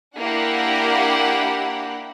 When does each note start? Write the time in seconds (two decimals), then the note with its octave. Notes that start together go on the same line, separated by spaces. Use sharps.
0.19 A#3 D4 E4 G4 F#5